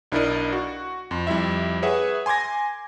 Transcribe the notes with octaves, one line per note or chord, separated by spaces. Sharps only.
B1 D4 E4 A#4 D5 D#5
F#4
F2 C6
F2 G3 E4 E5
G#4 B4 C#5 E5 F#5
G#5 C6 D6 G#6 A#6